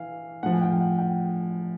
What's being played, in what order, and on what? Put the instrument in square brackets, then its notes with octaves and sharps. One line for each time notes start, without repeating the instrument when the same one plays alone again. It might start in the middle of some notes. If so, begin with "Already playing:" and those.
Already playing: [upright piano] E3 F5
A2 F3 F#5
G#5
G5
F#5
G5